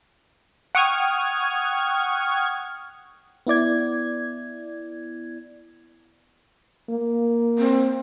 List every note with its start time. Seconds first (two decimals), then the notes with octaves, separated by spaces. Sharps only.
0.75 F#5 G5 C#6 D#6 F6 G#6
3.47 B3 E4 D5 G#6
6.89 A#3
7.59 C4